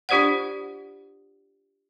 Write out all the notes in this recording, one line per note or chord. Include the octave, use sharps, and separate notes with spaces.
D4 F4 G4 C5 D5 F#5